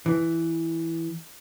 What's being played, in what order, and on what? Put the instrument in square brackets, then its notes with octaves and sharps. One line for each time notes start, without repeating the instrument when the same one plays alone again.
[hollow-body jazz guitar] E3